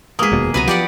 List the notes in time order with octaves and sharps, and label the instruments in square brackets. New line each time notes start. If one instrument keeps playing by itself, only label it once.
[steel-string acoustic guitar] G#3 B3 [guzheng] A#3 G#4 [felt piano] D#6 B6
[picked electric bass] F1 D#2 B2
[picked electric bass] C#2 C3 [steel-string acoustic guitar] F#3 B3 [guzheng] B4 G#5 A#5
[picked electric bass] F3 [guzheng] G4 D5 F#5